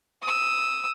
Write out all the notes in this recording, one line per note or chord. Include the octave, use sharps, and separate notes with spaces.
D#6 E6